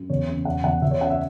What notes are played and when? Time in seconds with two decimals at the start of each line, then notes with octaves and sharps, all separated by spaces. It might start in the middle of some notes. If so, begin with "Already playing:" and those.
Already playing: F#2
0.10 E2 C#5
0.28 C#3
0.45 E1 F#5
0.64 E2 F#5
0.82 E2 E5
0.91 C#5
1.01 C#3 F#5
1.10 E5